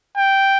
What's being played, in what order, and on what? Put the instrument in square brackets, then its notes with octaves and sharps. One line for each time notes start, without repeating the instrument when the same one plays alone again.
[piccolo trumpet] G5